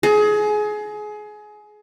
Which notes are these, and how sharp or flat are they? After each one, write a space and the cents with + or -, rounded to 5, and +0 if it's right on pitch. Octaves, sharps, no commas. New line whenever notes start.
G#4 +25